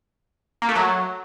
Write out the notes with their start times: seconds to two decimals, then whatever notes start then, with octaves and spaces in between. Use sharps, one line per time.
0.62 A#3
0.69 A3
0.75 F#3